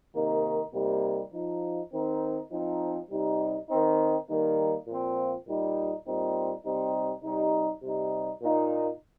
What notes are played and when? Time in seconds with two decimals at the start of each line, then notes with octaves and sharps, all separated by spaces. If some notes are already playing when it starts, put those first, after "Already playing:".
0.14 C3 D#3 A#3 D#4
0.73 C3 G3 A#3 D#4
1.33 F3 D#4
1.92 D#3 C4 D#4
2.51 F3 C4 D#4
3.10 C3 G3 D#4
3.68 D#3 C4 D#4
4.28 D#3 G3 A#3 D#4
4.87 A#2 F3 C4
5.46 A#2 G3 D#4
6.05 A#2 G3 C4 D#4
6.65 C3 G3 C4 D#4
7.23 C3 G3 D#4
7.83 C3 G3 D#4
8.41 A#2 A#3 D#4